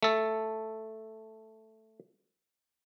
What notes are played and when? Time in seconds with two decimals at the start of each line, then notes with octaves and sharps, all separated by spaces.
0.03 A3 A4